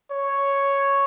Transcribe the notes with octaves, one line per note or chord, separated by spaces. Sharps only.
C#5